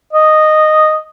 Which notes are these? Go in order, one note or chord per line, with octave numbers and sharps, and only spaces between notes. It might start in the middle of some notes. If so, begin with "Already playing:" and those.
D#5